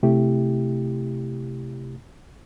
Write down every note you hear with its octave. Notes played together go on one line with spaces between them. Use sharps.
C3 A3 E4 G4